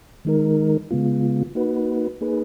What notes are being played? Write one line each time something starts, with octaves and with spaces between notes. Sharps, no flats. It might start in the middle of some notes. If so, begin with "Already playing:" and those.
D#3 G#3 D#4 A#4
C#3 G#3 B3 F4
A#3 D#4 F#4 B4
A#3 D#4 G#4 B4